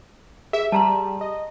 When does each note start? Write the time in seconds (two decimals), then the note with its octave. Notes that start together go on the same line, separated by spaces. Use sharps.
0.53 G#4 E5
0.72 G3 A5 A#5 C6
1.21 D#5